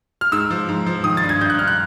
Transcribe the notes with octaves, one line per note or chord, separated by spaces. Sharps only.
F6
G#2 E6
F3
G#2
F3
D#3 D#6
A6
G2
G#6
G2 G6
F#6
G2 F6
F#6